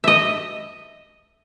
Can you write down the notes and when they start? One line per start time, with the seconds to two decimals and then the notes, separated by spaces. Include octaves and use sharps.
0.04 D#5 E5